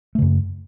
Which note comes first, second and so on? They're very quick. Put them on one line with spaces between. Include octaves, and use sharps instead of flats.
A3 C#3 F#2